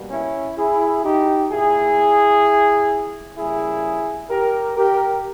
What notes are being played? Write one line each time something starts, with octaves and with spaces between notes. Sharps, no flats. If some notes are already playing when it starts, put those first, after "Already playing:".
Already playing: B2 G3 A#3
C#4 E4
E4 G#4
D#4 G4
A#2 A#3 E4 G#4
C#3 G3 A#3 E4 G#4
G4 A#4
G4 A#4